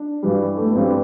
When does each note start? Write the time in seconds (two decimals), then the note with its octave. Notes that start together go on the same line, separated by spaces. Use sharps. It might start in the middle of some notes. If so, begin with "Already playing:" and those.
Already playing: D4
0.23 G2 E3 G3
0.57 A3
0.67 B3
0.75 G2 E3 G3 C4